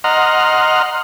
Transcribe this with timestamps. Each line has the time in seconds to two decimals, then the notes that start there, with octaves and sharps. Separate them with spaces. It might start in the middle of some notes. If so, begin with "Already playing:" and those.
0.04 D#5 F#5 A#5 C6 F6